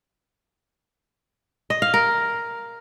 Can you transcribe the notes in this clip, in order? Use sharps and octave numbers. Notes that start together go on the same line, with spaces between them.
D#5
F5
A#4